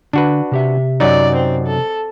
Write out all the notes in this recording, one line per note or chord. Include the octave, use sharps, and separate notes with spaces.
D3 D4 F#4 B4
C3 G4 E5
F#2 F#3 D#4 D5
C4
A4